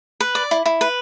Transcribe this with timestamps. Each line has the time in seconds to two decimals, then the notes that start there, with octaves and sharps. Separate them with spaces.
0.20 B4
0.35 D5
0.51 E4
0.66 E4
0.81 B4